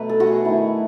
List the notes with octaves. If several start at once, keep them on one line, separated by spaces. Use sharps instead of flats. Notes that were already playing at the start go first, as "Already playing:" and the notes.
Already playing: B2 F#3 A3 B4
A4
F#4
G#4
D#3 A3 E4